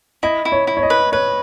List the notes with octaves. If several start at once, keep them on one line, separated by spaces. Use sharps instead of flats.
E4 D#5
E4
C#5
E4
C#5
D#5
B4
B4 C#5